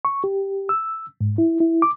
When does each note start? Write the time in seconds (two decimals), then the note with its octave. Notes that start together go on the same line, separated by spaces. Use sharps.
0.05 C#6
0.24 G4
0.69 E6
1.21 G#2
1.38 E4
1.60 E4
1.82 D6